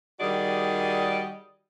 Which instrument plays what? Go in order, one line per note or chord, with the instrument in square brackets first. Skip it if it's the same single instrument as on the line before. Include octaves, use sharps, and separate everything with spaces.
[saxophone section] D#3 G3 F#4 G#4 D5 D#5